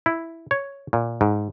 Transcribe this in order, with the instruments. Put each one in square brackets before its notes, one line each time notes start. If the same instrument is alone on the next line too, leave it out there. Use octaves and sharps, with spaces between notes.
[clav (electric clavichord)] E4
C#5
A#2
G#2